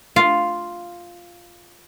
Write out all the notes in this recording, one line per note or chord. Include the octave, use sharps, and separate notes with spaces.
F4 F5